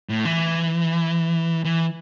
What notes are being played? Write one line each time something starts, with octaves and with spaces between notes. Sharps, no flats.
A2
E3
E3